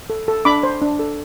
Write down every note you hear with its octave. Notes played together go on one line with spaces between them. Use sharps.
A4
A4
D4 B5 D6
C5
D4
A4